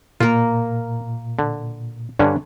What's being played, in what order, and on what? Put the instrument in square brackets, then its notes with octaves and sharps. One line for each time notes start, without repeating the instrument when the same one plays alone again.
[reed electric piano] A#2 [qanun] A#3 A#4 [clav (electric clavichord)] F4
[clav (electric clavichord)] D3
[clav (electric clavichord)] G2 D3 C#4 [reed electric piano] D4